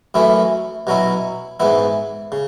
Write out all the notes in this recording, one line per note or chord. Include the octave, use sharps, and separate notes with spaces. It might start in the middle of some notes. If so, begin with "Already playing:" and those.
F#2 E3 A3 C#4 E4
B2 F#3 C#4 E4
G#2 E3 B3 E4
C#3